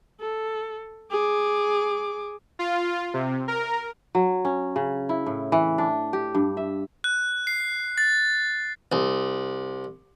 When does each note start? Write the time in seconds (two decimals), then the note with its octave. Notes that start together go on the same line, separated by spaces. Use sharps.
0.21 A4
1.11 G#4 D6
2.59 F4
3.14 C3
3.48 A#4
4.15 F#3
4.45 C#4
4.76 C#3
5.09 E4
5.26 A2
5.52 E3
5.78 D4
6.13 G4
6.35 G2
6.57 E5
7.04 F#6
7.47 C7
7.98 A6
8.92 C2